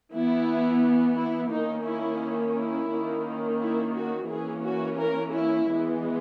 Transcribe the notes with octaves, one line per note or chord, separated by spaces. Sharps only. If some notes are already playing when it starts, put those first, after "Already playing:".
E3 B3 E4
E4
D#3 A#3 C#4 D#4
E4
E4
D#3 A#3 C#4
E4
F#4
E3 A#3 C#4 G#4
F#4
A#4
E4
E3 G#3 B3